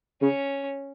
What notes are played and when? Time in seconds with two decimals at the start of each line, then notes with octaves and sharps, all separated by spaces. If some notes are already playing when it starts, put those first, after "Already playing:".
0.22 C#3 C#4